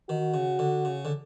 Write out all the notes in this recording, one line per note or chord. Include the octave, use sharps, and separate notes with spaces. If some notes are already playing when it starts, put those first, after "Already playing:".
D#3 F#4
C#3
D3
C#3
D3